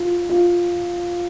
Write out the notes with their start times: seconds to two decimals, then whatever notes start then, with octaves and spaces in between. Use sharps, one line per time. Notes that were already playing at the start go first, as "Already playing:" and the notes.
Already playing: F4
0.29 F4